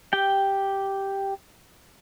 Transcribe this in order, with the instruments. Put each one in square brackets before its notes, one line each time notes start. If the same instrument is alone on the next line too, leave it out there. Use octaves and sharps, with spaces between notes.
[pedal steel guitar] G4 G5